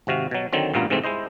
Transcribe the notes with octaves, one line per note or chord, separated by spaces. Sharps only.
G#1 C3 F#4 F5
B2 F#3
D3 D#3 F#3 C4
A1 G2 A#2 B3 F4 A#5
G#2 C3 E3 A3 C4
G#3 E4 C5 D#5